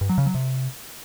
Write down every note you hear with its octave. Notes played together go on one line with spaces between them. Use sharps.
G2
F#3
C#3
F#3
C3